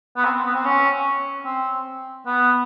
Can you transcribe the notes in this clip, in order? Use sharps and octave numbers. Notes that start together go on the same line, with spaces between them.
B3
C4
B3
C4
C#4
C4
B3